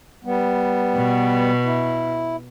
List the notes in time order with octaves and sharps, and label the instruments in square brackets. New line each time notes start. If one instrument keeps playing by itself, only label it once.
[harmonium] G3 B3
[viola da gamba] B2
[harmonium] E4